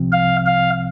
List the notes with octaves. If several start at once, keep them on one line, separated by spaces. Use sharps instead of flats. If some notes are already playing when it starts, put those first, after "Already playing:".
Already playing: C2 C3 F3 C4
F5
F5